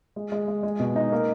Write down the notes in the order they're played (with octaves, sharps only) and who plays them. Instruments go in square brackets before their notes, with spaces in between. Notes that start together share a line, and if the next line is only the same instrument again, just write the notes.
[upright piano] G#3
G#3
G#3
G#3
B2
D#4
A#3